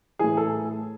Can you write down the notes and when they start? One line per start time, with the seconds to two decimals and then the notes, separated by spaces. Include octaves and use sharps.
0.19 A2 E3 G#4
0.37 A4